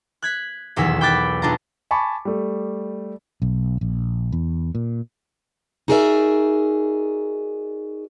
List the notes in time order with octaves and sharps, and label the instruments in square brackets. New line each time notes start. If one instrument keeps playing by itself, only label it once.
[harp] F#6 G#6 B6
D#1 B1 E2 F#3 E6 B6
G5 B5 D6 F#6 A6 B6
B1 D4 F4 A5 A#5
[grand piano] G#5 A5 B5 C#6 D6
G3 A3
[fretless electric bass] B1
A#1
E2
A#2
[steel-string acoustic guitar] D#4 F#4 G#4 A#4 D5 E5